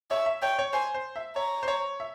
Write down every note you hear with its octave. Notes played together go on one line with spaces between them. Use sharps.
C#5 E5
E5
C#5 G5
C#5
C5 G#5
C5
E5
C#5 A#5
C5
C#5
E5